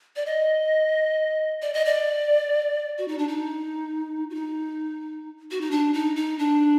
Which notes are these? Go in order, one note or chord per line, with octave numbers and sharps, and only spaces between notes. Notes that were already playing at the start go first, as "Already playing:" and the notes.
D5
D#5
D5
D#5
D5
F#4
D#4
D4
D#4
F#4
D#4
F#4
D#4
D4
D#4
D#4
D4